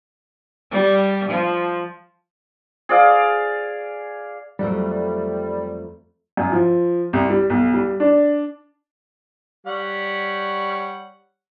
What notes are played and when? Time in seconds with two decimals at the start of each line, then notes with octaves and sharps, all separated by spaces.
0.71 G3
1.30 F3
2.89 G#4 D5 F5
4.59 F2 F#3 G3 A3
6.37 F#2
6.52 F3
7.13 C2
7.30 G3
7.50 B1
7.74 G3
8.00 D4
9.67 G3 C#5 F#5